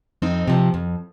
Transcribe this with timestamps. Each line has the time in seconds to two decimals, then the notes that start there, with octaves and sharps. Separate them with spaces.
0.22 F2 C4 D#4
0.48 C3 F3
0.74 F2